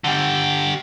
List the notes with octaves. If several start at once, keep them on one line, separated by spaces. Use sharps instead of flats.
D3 G4